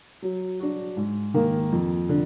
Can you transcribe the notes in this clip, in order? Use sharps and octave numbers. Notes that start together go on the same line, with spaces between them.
F#3
D4 F#4
G#2
D#3 A#3
F2
D3